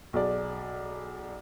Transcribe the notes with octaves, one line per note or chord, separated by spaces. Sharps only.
B1 G#4 D5